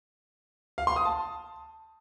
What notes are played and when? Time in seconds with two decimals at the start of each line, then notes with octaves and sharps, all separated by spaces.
0.78 F5
0.87 C6
0.96 D#6
1.05 A5